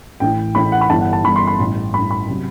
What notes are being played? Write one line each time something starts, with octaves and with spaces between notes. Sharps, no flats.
A1 A2 E3 G5
A1 A2 E3 B5
F#5
B5
G1 G2 E3 A5
F#5
A5
G1 G2 E3 B5
C6
B5
A1 G2 E3
A1 G2 E3 B5
B5
C3 F#3